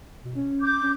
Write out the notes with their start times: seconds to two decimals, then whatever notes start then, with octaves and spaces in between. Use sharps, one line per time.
0.24 B2
0.36 C#4
0.62 D6 G6
0.82 C#4